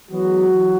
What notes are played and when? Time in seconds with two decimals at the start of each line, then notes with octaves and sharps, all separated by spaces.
0.11 E3 F#3 G#3 B3 F#4
0.49 E3